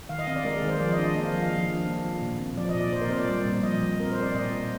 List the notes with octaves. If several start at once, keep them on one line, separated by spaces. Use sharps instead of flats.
D#3 F5
D#5
C4 F5
D5
G#3 A#4
G#4
D#3
C5
F3 D5
D#5
D4
D#5
A#3 D#5
F5
F3
F5
F3
D4
A#3
F3
A#2
C4
F3 D5
D#5
A#2
D5
A#2 C5
A#4
C4 C5
D5
G3
A#2
F3 D#5
F3
C4 A#4
C5
C4
D5
A#2 D#5
A#3